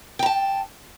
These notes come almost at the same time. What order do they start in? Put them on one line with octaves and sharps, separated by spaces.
G5 A#5 A5